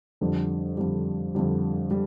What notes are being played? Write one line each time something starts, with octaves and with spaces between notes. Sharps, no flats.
F2 D3 G3
F2 D3 G3
F2 D3 G3
G3